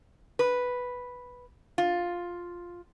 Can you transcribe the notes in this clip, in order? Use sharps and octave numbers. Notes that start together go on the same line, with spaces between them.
B4
F4